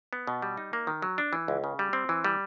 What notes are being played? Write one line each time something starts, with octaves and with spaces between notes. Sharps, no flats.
B3
B2
G3
D#4
A#3
D#3
F#3
D4
E3
C#2
C#3
G3
C4
E3
G3